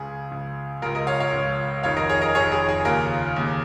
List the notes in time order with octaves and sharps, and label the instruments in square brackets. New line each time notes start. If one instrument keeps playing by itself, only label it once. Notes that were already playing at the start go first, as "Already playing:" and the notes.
Already playing: [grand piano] C#2 C#3 G#4
C#2 C#3
C#2 C#3 F4 A#4
A#4 D#5
C#5 F5
C#5 F5
C#2 C#3
F1 F2 D#3 C#5 F5
A#4 D#5
G#4 C#5
A#4 D#5
F1 F2 D#3 G#4 C#5
G#4
G#4
D#2 C#3 F4 A#4
D#2 C#3